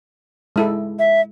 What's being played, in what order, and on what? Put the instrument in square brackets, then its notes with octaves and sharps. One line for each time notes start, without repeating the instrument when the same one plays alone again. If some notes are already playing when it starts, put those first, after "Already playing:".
[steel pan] G#3 E4 A4
[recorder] E5